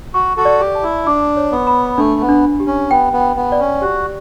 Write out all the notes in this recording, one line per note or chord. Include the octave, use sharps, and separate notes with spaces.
F#4 C#6
F#4 A4
D5
G4
A5
E4
D4 D6
C#5
B3
B5
A3 D4
B3
D4
G4
C#4
B3 G5
B3
G5
B3
D5
C#4
F#4 G4